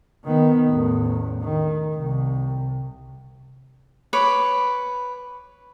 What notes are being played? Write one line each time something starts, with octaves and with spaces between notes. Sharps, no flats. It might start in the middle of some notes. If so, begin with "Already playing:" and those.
D#3 B3
A1 E2
D#3
C2
B4 C#5 D6